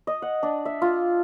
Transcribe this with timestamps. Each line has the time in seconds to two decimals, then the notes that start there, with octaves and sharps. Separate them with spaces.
0.07 D#5
0.22 F#5
0.43 D4
0.65 E5
0.82 F4